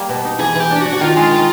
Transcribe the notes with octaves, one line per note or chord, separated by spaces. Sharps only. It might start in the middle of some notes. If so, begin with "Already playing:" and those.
Already playing: G3 A#3
B2
D#4
E3 G#4
E3 G4
D4
F#4
D4
F#4
D#3 F4
G#3
D#3